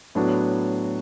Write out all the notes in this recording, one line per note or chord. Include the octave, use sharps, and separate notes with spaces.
A2 F#3 B3 D4 F#4